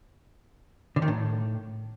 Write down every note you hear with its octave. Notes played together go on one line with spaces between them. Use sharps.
D3
D#3
A2